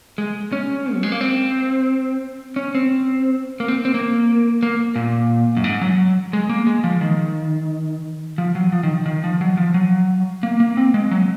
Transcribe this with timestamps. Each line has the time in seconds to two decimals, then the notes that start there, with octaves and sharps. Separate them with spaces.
0.18 G#3
0.52 C#4
0.94 F#3
1.03 G#3
1.12 A#3
1.21 C4
2.56 C#4
2.75 C4
3.60 A#3
3.68 C4
3.85 C4
3.94 A#3
4.63 A#3
4.96 A#2
5.57 F#2
5.64 G#2
5.81 F#3
6.33 G#3
6.49 A#3
6.67 G#3
6.84 F3
7.01 D#3
8.38 F3
8.55 F#3
8.72 F3
8.83 D#3
9.06 D#3
9.24 F3
9.41 F#3
9.57 F3
9.74 F#3
10.43 A#3
10.60 A#3
10.77 C4
10.94 G#3
11.11 F#3